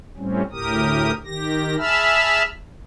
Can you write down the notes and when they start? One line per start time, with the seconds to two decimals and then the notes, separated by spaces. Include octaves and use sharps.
0.17 A2 G3 C4 C#4
0.52 D2 A2 G4 A#4 D#6
1.26 D#3 G4 A#6
1.78 G#4 E5 A5 B5 E6 F6